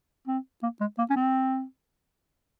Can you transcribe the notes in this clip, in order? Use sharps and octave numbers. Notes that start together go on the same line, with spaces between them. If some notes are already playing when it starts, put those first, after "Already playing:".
C4
A#3
G#3
A#3
C#4
C4